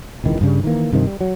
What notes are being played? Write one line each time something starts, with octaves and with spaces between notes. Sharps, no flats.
E1 C#2 D#3 E3
G2 C#3 G3
D#3 E3 A#3
G2 C3 D#3 F3
G3
F#3